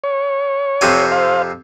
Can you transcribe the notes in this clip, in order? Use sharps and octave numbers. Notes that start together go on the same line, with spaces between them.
C#5
F2 C3 G#5
C5 F5